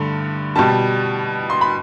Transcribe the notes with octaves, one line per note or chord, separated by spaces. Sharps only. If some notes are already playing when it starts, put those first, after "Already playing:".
Already playing: G2 D3 A3
B2 G3 A5
C6
B5